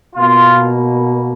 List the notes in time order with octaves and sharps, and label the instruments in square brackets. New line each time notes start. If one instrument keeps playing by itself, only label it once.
[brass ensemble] B2 A#3 F4